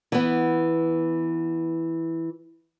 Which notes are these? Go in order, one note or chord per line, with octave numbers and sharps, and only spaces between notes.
E3 B3